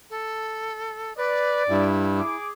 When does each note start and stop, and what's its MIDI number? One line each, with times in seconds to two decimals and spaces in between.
0.10 1.13 69
1.17 1.63 71
1.17 1.85 74
1.69 2.21 43
1.69 2.36 64
2.19 2.49 68
2.19 2.49 86